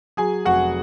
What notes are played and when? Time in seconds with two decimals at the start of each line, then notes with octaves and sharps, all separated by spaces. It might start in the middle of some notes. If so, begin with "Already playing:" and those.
0.17 F#3 G#4 G#5
0.45 F1 F#4 F#5